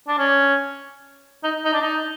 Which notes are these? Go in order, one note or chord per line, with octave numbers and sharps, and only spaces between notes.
D4
C#4
D#4
D#4
D4
D#4